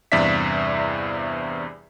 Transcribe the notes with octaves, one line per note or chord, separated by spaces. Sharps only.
E2 G2 C3 D5 E5 B6